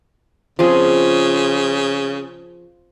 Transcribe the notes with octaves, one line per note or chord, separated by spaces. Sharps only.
C#3 F3 C4 G#4